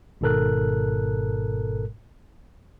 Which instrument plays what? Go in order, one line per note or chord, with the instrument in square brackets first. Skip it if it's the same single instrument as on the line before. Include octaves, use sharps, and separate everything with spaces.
[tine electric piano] G#1 G#2 B2 A4 A#4 F#6